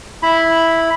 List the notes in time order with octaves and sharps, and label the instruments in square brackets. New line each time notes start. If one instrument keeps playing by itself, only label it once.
[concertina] E4 B5